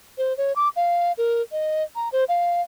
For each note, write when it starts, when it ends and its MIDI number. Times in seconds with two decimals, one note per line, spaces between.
0.18 0.36 72
0.37 0.53 73
0.56 0.69 86
0.76 1.12 77
1.18 1.42 70
1.52 1.83 75
1.96 2.09 82
2.12 2.24 72
2.29 2.62 77